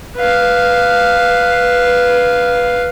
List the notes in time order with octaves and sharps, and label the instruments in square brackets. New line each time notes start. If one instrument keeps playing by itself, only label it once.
[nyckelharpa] B4 F5